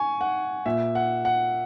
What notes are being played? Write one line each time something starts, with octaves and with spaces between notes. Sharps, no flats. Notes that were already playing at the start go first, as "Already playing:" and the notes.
Already playing: G#5 C#6
F#5
A#2 E5
F#5
F#5